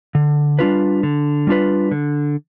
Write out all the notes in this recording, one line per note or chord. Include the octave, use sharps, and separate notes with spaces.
D3
G3 D4 F4 B4
D3
G3 D4 F4 B4
D3